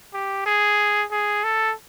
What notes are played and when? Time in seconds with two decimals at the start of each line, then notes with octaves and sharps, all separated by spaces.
0.14 G4
0.46 G#4
1.11 G#4
1.44 A4